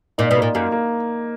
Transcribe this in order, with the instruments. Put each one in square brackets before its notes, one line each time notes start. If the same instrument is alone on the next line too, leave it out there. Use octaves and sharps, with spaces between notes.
[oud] A#2 [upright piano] D#4
[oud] B2
[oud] A#2 [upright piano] A#3
[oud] F#2 [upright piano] A#3
[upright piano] A#3